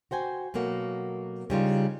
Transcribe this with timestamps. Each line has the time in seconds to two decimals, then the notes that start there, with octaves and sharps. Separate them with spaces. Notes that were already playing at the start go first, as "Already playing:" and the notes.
0.11 F#4 C5 G5 G#5
0.54 B2 F#3 A3 A#3 F#4
1.50 C#3 G3 D#4 F4